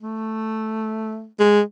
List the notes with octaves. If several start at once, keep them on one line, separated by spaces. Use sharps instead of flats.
A3
G#3